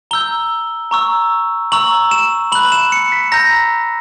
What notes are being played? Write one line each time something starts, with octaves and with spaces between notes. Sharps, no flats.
A#5 E6 G6 G7
A#5 C#6 E6
A#5 C#6 E6 F#7
E7
B5 F#6 F#7
E7
C#7
B6
A#5 E6 G6 A#6